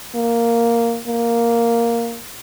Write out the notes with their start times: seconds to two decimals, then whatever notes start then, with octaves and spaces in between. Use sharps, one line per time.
0.15 A#3
1.07 A#3